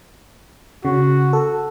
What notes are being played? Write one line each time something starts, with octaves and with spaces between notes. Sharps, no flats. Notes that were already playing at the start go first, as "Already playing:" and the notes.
C#3 F#4
A4